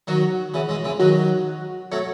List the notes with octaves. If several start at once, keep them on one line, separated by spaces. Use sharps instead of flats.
D#3 F#3 F#4
C#3 E3
E3 G#3
C#3 E3
D#3 F#3 F#4
F#3 A3 C#5